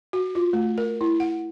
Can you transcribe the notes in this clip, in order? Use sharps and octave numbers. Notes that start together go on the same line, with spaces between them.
F#4
F4
A3
A#4
E4
F#5